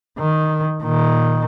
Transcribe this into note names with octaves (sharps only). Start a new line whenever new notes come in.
D#3
A#2 D#3